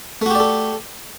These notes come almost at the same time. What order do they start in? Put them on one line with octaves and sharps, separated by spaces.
A3 F#4 G4 D5 A4